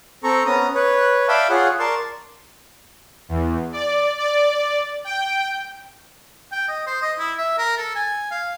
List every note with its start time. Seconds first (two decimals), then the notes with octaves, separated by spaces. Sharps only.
0.24 C4 A4 A#5 C#6
0.46 B3 C#4 A#5 D#6
0.75 B4 C#5
1.28 D5 E5 F5 G5 A5 B5
1.50 F4 G#4 C#5 F#5
1.79 A#4 D5 A5 C6 C#6
3.29 E2
3.72 D5
4.18 D5
5.04 G5
6.52 G5
6.69 D#5
6.87 C5
7.02 D#5
7.19 E4
7.38 E5
7.58 A#4
7.78 A4
7.95 G#5
8.31 F5